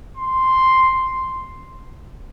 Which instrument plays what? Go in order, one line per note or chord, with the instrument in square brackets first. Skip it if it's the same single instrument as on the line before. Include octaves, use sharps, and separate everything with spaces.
[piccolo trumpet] C6